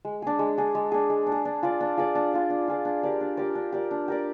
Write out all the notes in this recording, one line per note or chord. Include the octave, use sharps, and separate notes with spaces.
G#3
D4 G#4
G#3
D4 G#4
G#3
D4 G#4
G#3
D4
G#4
D4
F4 G#4 D5
D4
F4 G#4 D5
D4
F4 G#4 D5
D4
F4 G#4 D5
D4
G4 A#4 D5
D4
G4 A#4 D5
D4
G4 A#4 D5
D4
G4 A#4 D5